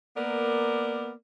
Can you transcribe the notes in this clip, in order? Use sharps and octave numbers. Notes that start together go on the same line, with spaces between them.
A#3 B3 A#4 D5